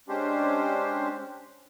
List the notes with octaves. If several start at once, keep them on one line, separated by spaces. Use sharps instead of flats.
G#3 C#4 D4 G4 C5